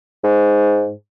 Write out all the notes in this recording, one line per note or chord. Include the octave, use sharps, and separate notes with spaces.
G#2